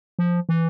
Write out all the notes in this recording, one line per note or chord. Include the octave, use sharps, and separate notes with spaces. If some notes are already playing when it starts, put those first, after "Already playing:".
F3
E3